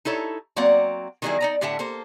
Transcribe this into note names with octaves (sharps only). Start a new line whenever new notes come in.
D#4 E4 A4 C#5
F#3 A#3 C4 D5 F#5
D#3 F#3 G3 C#4 E4 G#4
D#4 D5 A#5
A2 D3 G4 E5 F#5 A5
A#3 A4 C5